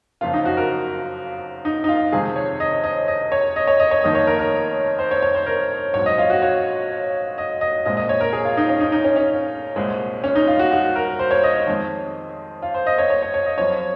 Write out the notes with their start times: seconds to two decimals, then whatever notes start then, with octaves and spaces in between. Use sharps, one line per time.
0.21 F#1 F2 C#3 F3 F4
0.33 D#4
0.45 F#4
0.57 A#4
1.65 D#4
1.84 D#4
1.89 F4
2.12 F2 C3 D#3 G#3 G#4
2.36 C#5
2.60 D#5
2.84 D#5
3.08 D#5
3.32 C#5
3.56 D#5
3.67 C#5
3.80 D#5
3.91 C#5
4.03 F1 F2 D#3 A#3 D#5
4.15 C#5
4.27 A#4
4.39 A#4
4.99 C5
5.11 C#5
5.23 C#5
5.35 C5
5.46 A#4
5.94 A#1 G#2 F#3 C4 C#5
6.06 D#5
6.18 F4
6.30 F#4
6.42 C#5
7.38 D#5
7.61 D#5
7.86 A#1 A#2 G#3 C4 D#5
7.97 D#5
8.09 C#5
8.21 A#4
8.33 G#4
8.45 F4
8.57 D#4
8.69 C#4
8.81 D#4
8.92 D#4
9.04 C#4
9.16 C#4
9.76 C2 A#2 G#3 C4
10.24 C#4
10.35 D#4
10.48 F4
10.59 F#4
10.72 F#4
10.96 A#4
11.19 C5
11.31 C#5
11.44 D#5
11.67 F2 D#3 G#3 C4
12.62 F4
12.74 C5
12.87 D#5
12.98 C#5
13.10 C#5
13.22 C#5
13.34 C#5
13.46 D#5
13.58 F#2 F3 C4 C#5